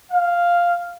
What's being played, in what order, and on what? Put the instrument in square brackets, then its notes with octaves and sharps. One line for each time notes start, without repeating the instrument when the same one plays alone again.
[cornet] F5